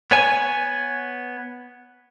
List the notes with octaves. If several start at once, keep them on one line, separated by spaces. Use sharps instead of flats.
B3 C#5 G#5